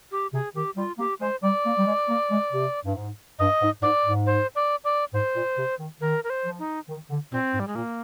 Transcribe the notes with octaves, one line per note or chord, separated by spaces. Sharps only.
G4
C3 G#4
D#3 G4
G3 F4
A#3 G4
G#3 C5
G3 D5
A#3
G3
G#3
A#3
G#3
C3
G2
G#2
G2 D#5
G#2
G#2 D5
G#2
C5
D5
D5
G#2 C5
A#2
C3
D#3
D#3 A#4
A#4
C5
F3
D#4
D#3
D3
A#2 C4
G#2
G3
G#3
A#2 A#3